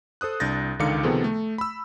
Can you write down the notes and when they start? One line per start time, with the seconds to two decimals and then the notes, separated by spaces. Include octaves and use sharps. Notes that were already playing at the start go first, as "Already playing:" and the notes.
0.21 A4 C5 D#6 F#6
0.40 C2 D4 G6 A6 A#6
0.79 C#2 D3 D#3 F5 D6 C#7
1.03 C3 D#3 F3 B3 G#4 A4
1.24 A3
1.58 B5 E6